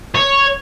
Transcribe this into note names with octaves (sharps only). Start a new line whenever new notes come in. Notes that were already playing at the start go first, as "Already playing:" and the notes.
C#5